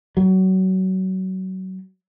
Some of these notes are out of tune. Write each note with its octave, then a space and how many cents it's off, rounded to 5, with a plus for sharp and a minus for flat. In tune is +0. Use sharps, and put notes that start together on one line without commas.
F#3 +25